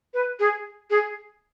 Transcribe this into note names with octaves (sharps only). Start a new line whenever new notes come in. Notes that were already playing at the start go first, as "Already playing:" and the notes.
B4
G#4
G#4